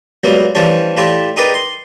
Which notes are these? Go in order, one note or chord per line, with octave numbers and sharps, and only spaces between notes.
C#2 F#3 G3 A#3 B3
E3 F3 G3 A3 C#4 D4
A2 A3 F4 G4 D5 E5
D#4 G4 G#4 A#4 B4 D5
C6